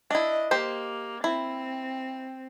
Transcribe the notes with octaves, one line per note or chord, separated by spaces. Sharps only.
D4 E4 D#5
A#3 G4 C5
C4 E4